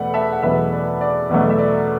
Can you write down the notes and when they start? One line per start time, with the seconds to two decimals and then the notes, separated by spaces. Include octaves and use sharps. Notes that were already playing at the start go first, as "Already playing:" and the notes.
Already playing: E2 B2 A3 B4 D5 F#5
0.14 E5 A5
0.32 F#5
0.42 E2 B2 F#3 A3 B4 E5
0.73 D5
1.01 D5
1.29 E2 B2 F#3 A3
1.50 E5
1.59 D5